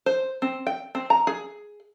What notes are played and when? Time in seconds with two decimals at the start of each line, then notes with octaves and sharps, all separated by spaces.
0.06 C5
0.42 C4
0.67 G5
0.95 C4
1.10 A#5
1.27 G#4